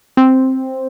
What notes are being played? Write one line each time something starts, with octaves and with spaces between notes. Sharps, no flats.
C4